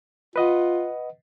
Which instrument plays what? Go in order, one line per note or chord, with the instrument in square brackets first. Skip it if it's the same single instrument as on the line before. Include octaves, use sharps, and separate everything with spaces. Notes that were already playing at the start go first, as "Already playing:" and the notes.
[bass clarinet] F4 [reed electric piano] B4 D#5 F#5